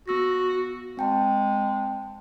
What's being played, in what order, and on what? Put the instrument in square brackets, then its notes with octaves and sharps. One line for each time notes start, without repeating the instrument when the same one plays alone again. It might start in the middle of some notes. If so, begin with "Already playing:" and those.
[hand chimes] B3 E6 A#6 [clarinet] F#4
[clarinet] G#3 [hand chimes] C4 G5 A5